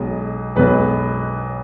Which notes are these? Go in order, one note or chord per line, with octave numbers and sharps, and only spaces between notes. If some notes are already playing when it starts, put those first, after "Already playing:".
Already playing: B1 B2 G#3
B1 B2 G#3 B4